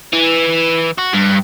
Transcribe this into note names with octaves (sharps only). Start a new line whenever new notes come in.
E3
F#4
G2